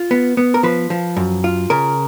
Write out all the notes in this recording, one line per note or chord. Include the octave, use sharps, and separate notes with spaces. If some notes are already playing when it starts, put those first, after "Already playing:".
Already playing: F4
B3
B3
A#4
F3 B4
F3
F#2
F4
C#3 A#4